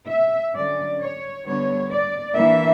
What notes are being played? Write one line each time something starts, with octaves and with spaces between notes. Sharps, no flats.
E5
D3 F#3 C#4 D5
C#5
D3 G3 B3 D4 C#5
D5
E3 A#3 D4 E5